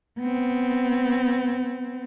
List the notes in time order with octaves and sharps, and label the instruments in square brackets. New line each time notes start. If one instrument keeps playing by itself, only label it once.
[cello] B3 C4